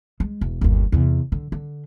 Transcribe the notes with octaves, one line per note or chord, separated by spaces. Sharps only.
G#3
E1
G1 D#2
E2 C3
D3
D3